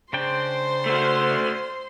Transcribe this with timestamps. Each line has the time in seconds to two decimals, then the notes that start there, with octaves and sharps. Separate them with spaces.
0.13 C#3 D4 C5 G5 C6
0.86 A3 F#4